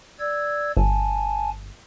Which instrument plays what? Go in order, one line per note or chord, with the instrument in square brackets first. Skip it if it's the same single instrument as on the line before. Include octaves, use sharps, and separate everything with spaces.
[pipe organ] D5 E6 G#6
[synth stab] G1 [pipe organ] G#5 A5